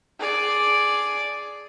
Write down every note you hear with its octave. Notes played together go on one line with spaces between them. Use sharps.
G#4 D5